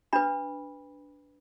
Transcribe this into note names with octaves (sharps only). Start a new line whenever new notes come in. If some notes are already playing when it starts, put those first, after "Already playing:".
D4 B4 B5